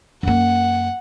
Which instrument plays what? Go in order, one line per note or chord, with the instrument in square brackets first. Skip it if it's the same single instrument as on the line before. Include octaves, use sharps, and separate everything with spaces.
[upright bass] F#2 A#3 [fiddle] F#5